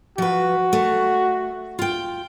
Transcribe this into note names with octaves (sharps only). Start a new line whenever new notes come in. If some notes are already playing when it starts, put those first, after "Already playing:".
F3 F#4 B4
A3
F4 G5